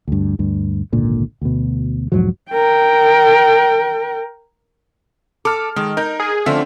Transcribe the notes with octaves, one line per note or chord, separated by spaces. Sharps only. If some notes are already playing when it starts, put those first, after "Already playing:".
D2 G2
D2 G2
G#1 C#2 A#2 D3
D2 B2
E1 G#2 F3 F#3
A#4 G5
A4 D6 F6
D#3 G#3
D#4 A#4 G6
G#4
D3 F3 A3 C4 C#4 E5